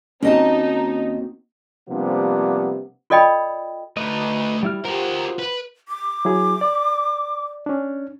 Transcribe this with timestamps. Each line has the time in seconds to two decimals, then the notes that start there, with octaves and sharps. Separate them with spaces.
0.23 D#2 A#3 C4 C#4 D#4 F#4 D#5 A5
1.88 C3 F3 G3 A#3 B3 D4
3.10 F4 A4 D5 D#5 G5 B5
3.97 D2 A3 D#4 B4 D#5
4.63 G3 E4 F6
4.84 F4 G4 A#4 C5 F#5
5.39 B4
5.88 D6
6.25 F#3 E4 G#4
6.61 D5
7.66 C#4 D4